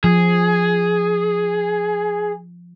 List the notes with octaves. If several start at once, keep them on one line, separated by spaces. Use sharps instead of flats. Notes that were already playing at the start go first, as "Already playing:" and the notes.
F3 G#4